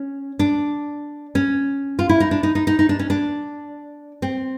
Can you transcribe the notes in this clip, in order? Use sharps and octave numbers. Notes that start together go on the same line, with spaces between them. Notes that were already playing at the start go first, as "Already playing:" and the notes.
Already playing: C#4
D4
C#4
F4
E4
D#4
D4
D#4
D#4
D#4
D#4
D4
C#4
D4
C4